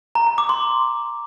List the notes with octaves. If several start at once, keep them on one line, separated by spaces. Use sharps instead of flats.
A#5
A#5
D6
C6